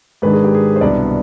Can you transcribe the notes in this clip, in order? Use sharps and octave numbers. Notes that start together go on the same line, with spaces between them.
G#2 D#3 G#3 D4 B4
G#4
G4
G#4
C5
C2 B2 B3 D4 D5